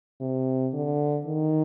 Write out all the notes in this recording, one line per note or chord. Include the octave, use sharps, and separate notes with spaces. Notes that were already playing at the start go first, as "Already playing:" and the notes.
C3
D3
D#3